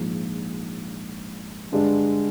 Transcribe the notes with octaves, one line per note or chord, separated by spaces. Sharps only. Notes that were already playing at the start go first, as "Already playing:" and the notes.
Already playing: A#1 G#2 F3
G2 D3 G#3 D4